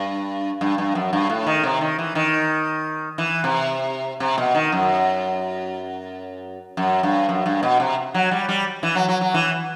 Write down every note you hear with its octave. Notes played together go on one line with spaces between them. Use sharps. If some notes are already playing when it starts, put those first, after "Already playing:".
Already playing: G2
G2
G2
F#2
G2
A2
D#3
C3
D#3
E3
D#3
E3
C3
C3
B2
D#3
F#2
F#2
G2
F#2
G2
B2
C3
F#3
G3
G3
E3
F#3
F#3
F#3
E3